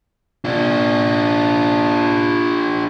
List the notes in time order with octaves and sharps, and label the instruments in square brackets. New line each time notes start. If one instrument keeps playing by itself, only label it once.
[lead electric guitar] D4 F4